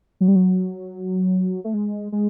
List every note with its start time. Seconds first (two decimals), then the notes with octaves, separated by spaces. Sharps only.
0.21 F#3
0.28 G3
0.35 F#3
1.64 A3
1.74 G#3
2.12 G#3